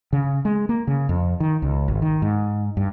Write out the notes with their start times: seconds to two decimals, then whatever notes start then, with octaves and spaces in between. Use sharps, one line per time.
0.13 C#3
0.45 G#3
0.69 A#3
0.87 C#3
1.09 F2
1.40 D#3
1.62 C#2
1.88 G#1
2.02 D#3
2.22 G#2
2.77 G2